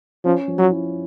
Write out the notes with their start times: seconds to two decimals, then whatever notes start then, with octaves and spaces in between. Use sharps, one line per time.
0.25 F3 C#4
0.48 F3
0.59 F#3
0.70 E4